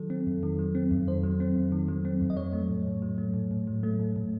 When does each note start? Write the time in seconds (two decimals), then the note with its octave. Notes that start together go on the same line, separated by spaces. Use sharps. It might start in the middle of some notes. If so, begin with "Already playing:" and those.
Already playing: D#3 F#3 A4
0.10 C4
0.27 F2
0.43 D#3
0.59 F#3
0.75 C4
0.91 F2
1.08 D#3 C5
1.23 F#3
1.40 C4
1.56 F2
1.72 D#3
1.88 F#3
2.05 C4
2.21 F2
2.30 D#5
2.37 F#3 C#5
2.53 A3
2.70 A2
2.86 A2
3.02 F#3
3.18 A3
3.34 A2
3.51 A2
3.67 F#3
3.83 A3
3.99 A2
4.16 A2